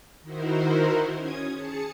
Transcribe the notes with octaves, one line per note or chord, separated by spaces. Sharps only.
D#3 D#4 E4 F#4 A#4 C5
C#4 D#6 G#6
G#4 A5 C#7